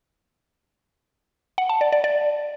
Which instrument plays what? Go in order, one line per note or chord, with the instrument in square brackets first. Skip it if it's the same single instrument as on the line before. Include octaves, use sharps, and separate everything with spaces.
[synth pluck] F#5
A5
D5
D5
D5